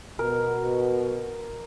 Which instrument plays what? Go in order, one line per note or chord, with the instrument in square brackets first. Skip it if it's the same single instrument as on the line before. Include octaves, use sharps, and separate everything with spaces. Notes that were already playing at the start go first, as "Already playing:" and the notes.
[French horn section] B2 [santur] A#4